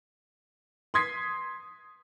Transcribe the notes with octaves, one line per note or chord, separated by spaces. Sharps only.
C6 D#6 G#6 B6 C7